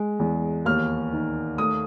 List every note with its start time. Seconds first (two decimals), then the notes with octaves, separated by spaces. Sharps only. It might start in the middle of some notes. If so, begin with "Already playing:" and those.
Already playing: G#3
0.20 E2
0.65 D#2 F6
1.13 D#3
1.58 A3 D#6